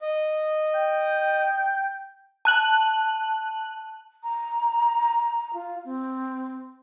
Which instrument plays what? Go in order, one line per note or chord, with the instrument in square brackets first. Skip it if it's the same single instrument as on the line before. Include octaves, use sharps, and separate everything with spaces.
[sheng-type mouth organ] D#5
[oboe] G5
[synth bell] A5 F#6 F#7
[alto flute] A#5
F4
C4